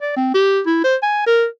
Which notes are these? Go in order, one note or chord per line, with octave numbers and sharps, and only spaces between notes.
D5
C4
G4
E4
C5
G#5
A#4